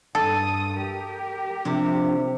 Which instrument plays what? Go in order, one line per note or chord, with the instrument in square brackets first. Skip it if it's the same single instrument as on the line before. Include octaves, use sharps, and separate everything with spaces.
[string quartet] G2 D#6 [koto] A4
[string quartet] G4 A#4
[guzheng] C3 [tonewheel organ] F3 D4